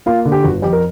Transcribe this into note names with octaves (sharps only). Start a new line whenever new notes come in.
A#3 F4
D3
G4
G1 F#4
F2 G4
A#4